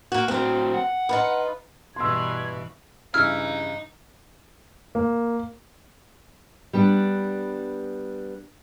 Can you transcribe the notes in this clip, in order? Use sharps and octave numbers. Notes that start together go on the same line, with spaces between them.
A#3 F#4
A2 F#3 C4 A#4
F#5
D#4 F4 B4
G2 B2 E3 C6 E6 G#6
G2 C#3 E3 D#4 E4 F6
A#3
G3 B3 D4